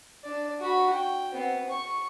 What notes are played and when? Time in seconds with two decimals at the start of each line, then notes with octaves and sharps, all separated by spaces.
0.24 D4 D5
0.61 F#4 B5
0.93 G5
1.33 B3 C4
1.70 C#6